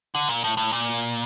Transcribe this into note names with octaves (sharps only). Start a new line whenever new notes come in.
D3
A#2
A2
A2
A#2